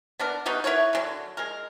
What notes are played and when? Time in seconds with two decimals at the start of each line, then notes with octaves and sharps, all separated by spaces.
0.19 B3 D4 A#4
0.46 B3 D#4 F#4 G4
0.64 E4 A#4 B4 C#5
0.93 D3 D#3 F#3
1.37 G#3 A#4